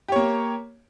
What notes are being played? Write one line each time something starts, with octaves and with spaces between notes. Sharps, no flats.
A#3 G4 C#5